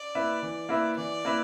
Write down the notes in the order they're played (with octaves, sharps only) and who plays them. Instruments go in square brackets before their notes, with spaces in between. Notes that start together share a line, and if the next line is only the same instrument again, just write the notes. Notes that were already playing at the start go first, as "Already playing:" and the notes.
Already playing: [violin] D5
[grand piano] A#3 E4 B4 E5
E3
A#3 E4 B4 E5
[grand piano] E3 [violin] D5
[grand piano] A#3 E4 B4 E5